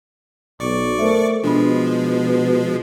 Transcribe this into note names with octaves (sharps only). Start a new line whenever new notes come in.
B1 D5 C#6 D6
A3 A#4 C5 E5
B2 F3 G#3 D4 B5